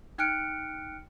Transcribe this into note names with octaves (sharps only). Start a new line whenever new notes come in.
D#4 G5 F6 F#6 C#7 D7